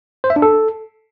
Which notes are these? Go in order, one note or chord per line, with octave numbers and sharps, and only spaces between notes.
C5
E5
D4
A4